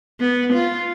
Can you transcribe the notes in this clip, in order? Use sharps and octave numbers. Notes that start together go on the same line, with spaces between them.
B3
F4